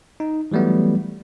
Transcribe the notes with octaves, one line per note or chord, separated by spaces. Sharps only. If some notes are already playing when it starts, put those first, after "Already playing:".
D#4
E3 F#3 G3 A3 B3